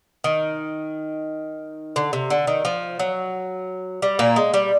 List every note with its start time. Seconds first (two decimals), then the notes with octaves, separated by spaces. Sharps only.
0.24 D#3
1.96 D3
2.13 C3
2.30 D3
2.47 D#3
2.65 F3
2.99 F#3
4.02 G3
4.19 A#2 A#3
4.36 G#3
4.54 G3